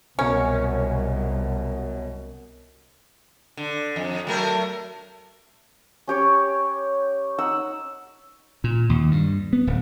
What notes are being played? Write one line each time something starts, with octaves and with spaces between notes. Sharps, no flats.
C2 F#2 B2 C#4 A#4 C#7
D3
F2
F#3 A3 A#4
C#4 G4 C#5
D#4 F#5 E6
A#2
D#2
G2
B3
D1